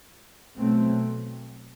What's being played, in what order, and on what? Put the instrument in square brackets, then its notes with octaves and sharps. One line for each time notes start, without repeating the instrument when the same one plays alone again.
[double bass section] B2 F#3 A3 C4